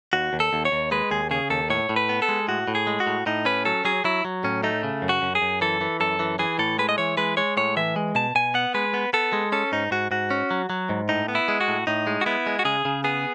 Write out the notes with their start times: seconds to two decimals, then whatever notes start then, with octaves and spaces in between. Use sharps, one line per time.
0.13 D#2 F#4
0.33 D#2
0.40 A4
0.53 D#2
0.65 C#5
0.72 D#2
0.91 G#3 B4
1.11 D#2 G#4
1.31 C#3 G#4
1.50 D#2 A4
1.70 A2 C#5
1.89 A2
1.96 B4
2.09 B3
2.22 A4
2.29 G#3
2.48 A2 F#4
2.68 A2
2.75 G#4
2.87 G#3
3.00 F#4
3.07 A2
3.26 A2 D#4
3.45 C#4 B4
3.65 F#3 A4
3.85 F#3 G#4
4.04 F#3 E4
4.25 F#3
4.44 A2 C#4
4.63 A3 D#4
4.83 C#3
5.02 F#2
5.09 F#4
5.22 F#2
5.35 G#4
5.42 F#2
5.61 E3 A4
5.81 E3
6.00 F#2 A4
6.19 E3
6.39 E3 G#4
6.59 A2 A4
6.79 G#3 B4
6.89 D#5
6.98 E3 C#5
7.17 G#3 B4
7.37 G#3 C#5
7.57 A2 C#5
7.76 E3 E5
7.96 G#3
8.15 B2 A5
8.35 B2 G#5
8.54 B3 F#5
8.74 G#3 B4
8.94 B3
9.13 B3 A4
9.33 G#3
9.52 C#4 A4
9.72 G#2 D#4
9.91 G#2 F#4
10.11 G#2 F#4
10.30 C#4
10.51 F#3
10.70 F#3
10.89 G#2
11.09 A2 D#4
11.28 B3
11.35 E4
11.48 G#3
11.61 F#4
11.68 A2
11.87 A2 D#4
12.07 G#3
12.21 F#4
12.26 B3 E4
12.47 G#3
12.59 F#4
12.65 C#3 G#4
12.85 C#3
13.04 B3 G#4